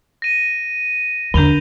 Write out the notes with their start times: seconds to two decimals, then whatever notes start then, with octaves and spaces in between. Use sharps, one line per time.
0.22 A#6 D#7
1.34 E2 D3 D4 G6 F7 G7